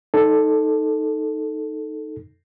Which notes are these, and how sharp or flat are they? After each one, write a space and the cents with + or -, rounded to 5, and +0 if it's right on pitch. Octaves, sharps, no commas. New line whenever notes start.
D#4 +0 A4 +0